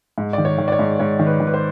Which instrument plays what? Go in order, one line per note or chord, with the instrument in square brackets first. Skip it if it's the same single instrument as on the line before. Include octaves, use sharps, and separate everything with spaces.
[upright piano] G#2
D#3 D5
C#5
D#3
D5
C#5
G#2
G#2 C#5
D#3
B4
D#3
B4
C5